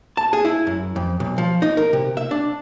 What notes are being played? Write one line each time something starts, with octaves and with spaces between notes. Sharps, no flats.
A5
G#4
E4
F#2
F2
B1
F3
D#4
A#4
C3
E5
D4